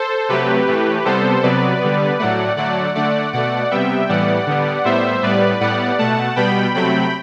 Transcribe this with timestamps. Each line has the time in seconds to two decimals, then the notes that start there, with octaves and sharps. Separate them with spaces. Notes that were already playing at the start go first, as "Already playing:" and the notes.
Already playing: A4 C5
0.29 C3 F#3 A3 G4 B4
0.67 A2 E3 A3
1.05 C3 G3 B3 A4 C5
1.43 C3 F#3 B3 B4 D5
1.81 D3 G3 B3
2.19 A2 F#3 A3 D5 F#5
2.56 D3 F#3 A3 D5 F#5
2.95 D3 A3 D5 F#5
3.33 B2 A3 D5 F#5
3.71 C3 G3 B3 E5 G5
4.09 A2 E3 G3 B3 D5 F#5
4.47 D3 G3 B3
4.84 A2 G3 B3 C5 E5
5.23 A2 G3 B3 B4 D5
5.60 A2 G3 B3 D5 F#5
5.99 B2 A3 F#5 A5
6.36 B2 G3 B3 G5 B5
6.74 C3 F#3 A3 G5 B5